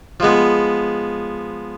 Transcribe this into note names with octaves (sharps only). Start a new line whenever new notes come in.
F3 G#3 B3